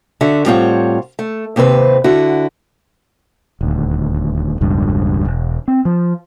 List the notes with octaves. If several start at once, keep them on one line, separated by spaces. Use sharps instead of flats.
D3 F#4 E5
A2 G3 C4 F4 C#5 F#5
A3
D#2 C3 C4 A#4 B4
D3 E4 F#4
D#1 D2
E1 C#2 G2
E1
C4
F3